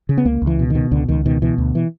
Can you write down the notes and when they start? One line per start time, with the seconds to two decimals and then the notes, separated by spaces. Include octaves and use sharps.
0.09 C#3
0.18 B3
0.25 C#2 A#3
0.42 C#2
0.47 E3
0.59 B2
0.70 B2 D#3
0.91 C#2 D3
1.08 C#2 D#3
1.26 B2 D#3
1.42 B2 E3
1.58 D2
1.75 E3